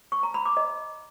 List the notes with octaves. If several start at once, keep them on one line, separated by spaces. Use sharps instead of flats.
C#6
A#5
B5
D6
D#5